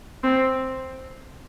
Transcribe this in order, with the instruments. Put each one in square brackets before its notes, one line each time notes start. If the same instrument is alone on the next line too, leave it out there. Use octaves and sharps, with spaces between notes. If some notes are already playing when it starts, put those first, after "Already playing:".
[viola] C4